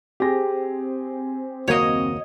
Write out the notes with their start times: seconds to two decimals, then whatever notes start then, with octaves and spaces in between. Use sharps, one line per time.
0.20 C4 G4 G#4 A#6
1.68 F#1 D#2 A#3 F#4 C#5 D#5